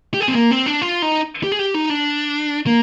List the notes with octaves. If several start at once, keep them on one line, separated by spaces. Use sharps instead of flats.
G4
G#4
C4
A#3
C4
D4
F4
D#4
G4
G#4
G4
D#4
D4
A#3